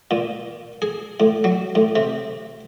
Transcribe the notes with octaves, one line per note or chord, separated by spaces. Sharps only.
A#2
G#4
A2
F#3
A2
C3